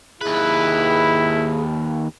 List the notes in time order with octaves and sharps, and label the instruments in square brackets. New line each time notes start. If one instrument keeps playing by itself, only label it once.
[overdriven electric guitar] D#2 B4 [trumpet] E4 [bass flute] G#4